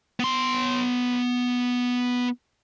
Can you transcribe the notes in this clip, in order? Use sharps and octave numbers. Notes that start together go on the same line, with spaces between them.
B3 C6